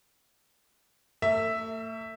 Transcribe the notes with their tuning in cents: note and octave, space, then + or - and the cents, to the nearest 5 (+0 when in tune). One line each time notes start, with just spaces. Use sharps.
A3 +40 E5 +0